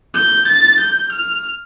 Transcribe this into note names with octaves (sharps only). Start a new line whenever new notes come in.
G6
A6
G6
F6